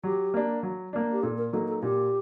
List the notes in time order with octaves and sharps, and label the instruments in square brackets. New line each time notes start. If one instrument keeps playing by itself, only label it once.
[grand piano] F#3 [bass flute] G4
[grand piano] A#3 D4
F#3
A#3 D4
[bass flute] G4
[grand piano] A#2 [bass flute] A4
[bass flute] A#4
[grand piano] F#3 A#3 D#4 [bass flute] A4
[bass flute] A4
[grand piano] A#2 [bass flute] G4